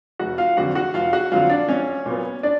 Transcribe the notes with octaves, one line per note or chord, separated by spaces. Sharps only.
F1 F#4 F#5
F4 F5
F2 D3 F#3 F#4 F#5
F#4 F#5
F1 F4 F5
F#4 F#5
F2 D3 F#3 F4 F5
D4 D5
A#1 C#4 C#5
A#2 F#3 B3
D4 D5